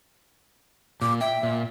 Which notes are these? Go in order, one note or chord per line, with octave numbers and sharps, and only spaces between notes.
A#2 D6
E5 G5
A#2